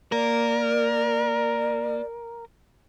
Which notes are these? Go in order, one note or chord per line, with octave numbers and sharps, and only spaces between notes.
A#3 A#4 D5